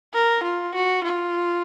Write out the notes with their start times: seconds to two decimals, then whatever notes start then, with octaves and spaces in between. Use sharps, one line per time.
0.14 A#4
0.44 F4
0.75 F#4
1.04 F4